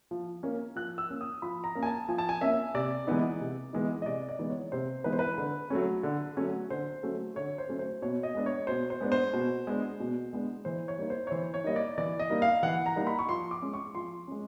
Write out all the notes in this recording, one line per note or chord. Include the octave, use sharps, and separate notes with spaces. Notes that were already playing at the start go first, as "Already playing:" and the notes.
F3
A#3 C#4
F3 F#6
E6
A#3 C#4
D#6
F3 B5
A#5
A#3 C#4
G#5
A5
F3 G#5
A5
G#5
A#3 C#4 E5
C3 D5
E3 G#3 B3 D#4
C3
E3 G#3 B3 D#4
D#5
C3 D5
D5
E3 G#3 B3 D#4
C#5
C3 C5
E3 G#3 B3 D#4 B4
C5
B4
D3
F#3 A3 C#4
D3
F#3 A3 C#4
D3 C5
F#3 A3 C#4
D3 C#5
C5
F#3 A3 C#4
C5
B2 C#5
D#5
G#3 B3 D4
C#5
B2 C5
C5
G#3 B3 D4
C5
B2
G#3 B3 D4
B2
G#3 B3 D4
E3 C5
C#5
G3 A#3 D#4
C5
C#5
E3 C5
C#5
G3 A#3 D#4 D#5
D5
E3 D5
D#5
G3 A#3 D#4
F5
E3 F#5
A#5
G3 A#3 D#4
B5
C#6
F3 C6
D6
G#3 C#4
C#6
F3 C6
G#3 C#4